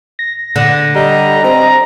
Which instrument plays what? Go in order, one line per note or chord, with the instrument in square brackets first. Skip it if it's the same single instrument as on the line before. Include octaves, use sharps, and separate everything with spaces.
[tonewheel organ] A#6
[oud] D3
[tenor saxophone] G3 [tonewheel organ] D#5 [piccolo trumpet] A#5
[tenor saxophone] C4 [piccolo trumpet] A#5